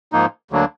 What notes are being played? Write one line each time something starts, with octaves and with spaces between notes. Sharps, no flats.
G#2 F3 A#3 D#4
D2 D3 F#3 A#3 D4